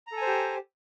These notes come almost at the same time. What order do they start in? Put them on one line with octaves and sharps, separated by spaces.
A#5 A4 G#5 C5 G4